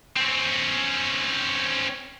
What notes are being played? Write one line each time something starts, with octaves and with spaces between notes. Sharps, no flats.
C4 C#4